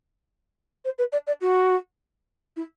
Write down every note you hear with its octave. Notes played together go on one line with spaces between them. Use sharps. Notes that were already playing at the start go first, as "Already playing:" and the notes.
C5
B4
D5
D5
F#4
E4